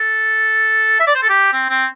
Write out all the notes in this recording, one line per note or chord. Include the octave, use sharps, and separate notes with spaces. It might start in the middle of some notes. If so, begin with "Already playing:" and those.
Already playing: A4
E5
D5
C5
A4
G4
C4
C4